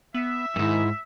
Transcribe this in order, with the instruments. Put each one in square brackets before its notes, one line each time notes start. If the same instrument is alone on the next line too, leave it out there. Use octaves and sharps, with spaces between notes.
[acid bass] B3 [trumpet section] E5
[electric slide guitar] F2 G#2 [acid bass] D#3 [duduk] E4